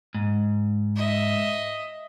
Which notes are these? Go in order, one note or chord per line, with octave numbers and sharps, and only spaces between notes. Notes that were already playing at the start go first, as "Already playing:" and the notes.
G#2
D#5 E5